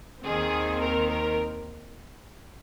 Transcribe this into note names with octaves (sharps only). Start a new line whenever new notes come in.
D#2 D#3 C4 G#4
A#4
A#4